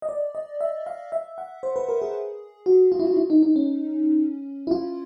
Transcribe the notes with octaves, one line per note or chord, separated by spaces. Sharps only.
D#5
D5
D#5
E5
F5
E5
F#5
C5
B4
A#4
G#4
F#4
F4
E4
F4
E4
D#4
D#4
C#4
E4
F4